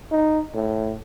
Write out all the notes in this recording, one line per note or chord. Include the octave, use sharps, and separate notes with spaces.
D#4
A2